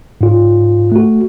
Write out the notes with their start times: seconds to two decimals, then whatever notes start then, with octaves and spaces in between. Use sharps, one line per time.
0.21 G#2 F4
0.92 A3 F#4